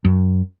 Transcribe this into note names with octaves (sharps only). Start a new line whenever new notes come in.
F#2